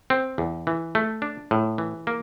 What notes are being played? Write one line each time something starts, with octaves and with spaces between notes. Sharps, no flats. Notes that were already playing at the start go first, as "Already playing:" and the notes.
C4
E2
E3
A3
D4
A2
E3
A#3